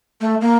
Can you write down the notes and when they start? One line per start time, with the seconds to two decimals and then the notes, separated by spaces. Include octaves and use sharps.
0.21 A3
0.41 A#3